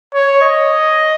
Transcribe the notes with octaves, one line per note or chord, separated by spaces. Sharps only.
C#5
D#5